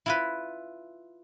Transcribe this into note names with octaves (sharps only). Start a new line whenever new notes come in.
E4 F4 B4